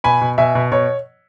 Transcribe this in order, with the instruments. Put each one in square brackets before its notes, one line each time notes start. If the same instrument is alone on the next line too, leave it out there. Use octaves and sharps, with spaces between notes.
[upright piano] B2 G#5 B5
B2
B2 E5 G#5
B2
B2 C#5